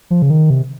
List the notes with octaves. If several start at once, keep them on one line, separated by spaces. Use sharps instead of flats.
F3
C#3
D#3
C3